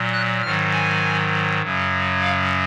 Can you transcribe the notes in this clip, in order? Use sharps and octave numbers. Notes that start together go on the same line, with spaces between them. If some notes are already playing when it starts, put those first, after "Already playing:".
Already playing: A#2 F#3
F#6
G#2 D#3 F#3 F6
G#5
F#2 C#3 F#3
F5